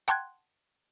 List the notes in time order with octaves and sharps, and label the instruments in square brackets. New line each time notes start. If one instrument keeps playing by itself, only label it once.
[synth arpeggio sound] F#5 G5 A5 C6 F#6 G#6